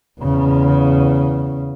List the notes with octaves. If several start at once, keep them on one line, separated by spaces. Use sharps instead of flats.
E2 C#3